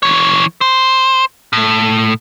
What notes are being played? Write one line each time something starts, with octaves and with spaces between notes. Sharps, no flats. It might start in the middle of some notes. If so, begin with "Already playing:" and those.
E3 C#5
C5
A2